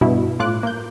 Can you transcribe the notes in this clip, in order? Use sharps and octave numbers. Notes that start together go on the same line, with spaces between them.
G2 B2 E4
A2 F4 D6 F#6
A#3 G6